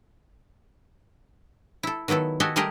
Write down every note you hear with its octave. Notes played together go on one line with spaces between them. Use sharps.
E4 A4
D#3 F#3 B3 E4 A4
F#4 G4 A4 D#5 G#5
G3 A3 G4 G#4 A#4 D#5